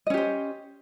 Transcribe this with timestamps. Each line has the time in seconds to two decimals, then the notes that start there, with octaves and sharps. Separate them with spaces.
0.07 D#5
0.10 C#4
0.14 G4
0.17 C5